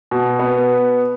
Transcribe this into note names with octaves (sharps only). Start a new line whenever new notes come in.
B2
B3